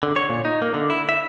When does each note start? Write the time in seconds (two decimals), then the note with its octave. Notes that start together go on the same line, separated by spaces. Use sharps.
0.03 D3
0.16 C#5
0.30 A#2
0.45 D#4
0.62 A#3
0.74 D3
0.90 E4
1.09 E5